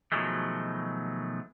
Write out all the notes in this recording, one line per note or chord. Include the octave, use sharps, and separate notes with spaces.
B2 D#3 F3 F#3 G#3 A3